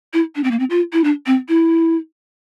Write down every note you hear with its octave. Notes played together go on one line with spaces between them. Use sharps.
E4
D4
C4
A#3
C4
F4
E4
D4
C4
E4